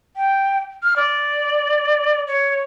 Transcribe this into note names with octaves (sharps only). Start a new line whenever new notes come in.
G5
F6
D5
C#5